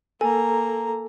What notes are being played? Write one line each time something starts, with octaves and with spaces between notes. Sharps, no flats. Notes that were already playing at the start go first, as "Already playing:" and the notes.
A#3 A4 G#5 A#5